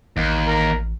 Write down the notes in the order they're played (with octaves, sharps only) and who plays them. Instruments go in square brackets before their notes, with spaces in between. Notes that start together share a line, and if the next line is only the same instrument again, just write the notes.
[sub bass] A1 [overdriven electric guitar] D#2
[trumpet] A#4